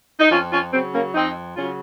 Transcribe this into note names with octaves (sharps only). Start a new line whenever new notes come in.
D#4
F2 C#4 F4
C#4 F4
C#3 F#3 C4
A#3 C#4
F2 C4 D#4
C#3 F#3 C#4 F4